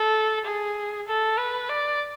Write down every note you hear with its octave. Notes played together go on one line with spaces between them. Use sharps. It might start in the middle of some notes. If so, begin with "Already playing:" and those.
Already playing: A4
G#4
A4
B4
D5